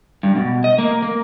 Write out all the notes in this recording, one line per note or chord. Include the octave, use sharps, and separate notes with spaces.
G2
B2
D#5
A#3
A#3